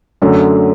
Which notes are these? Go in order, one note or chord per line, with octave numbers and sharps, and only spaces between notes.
F#2 D3 F#3 A3